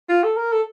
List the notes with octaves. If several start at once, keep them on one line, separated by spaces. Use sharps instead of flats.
F4
A4
A#4
A4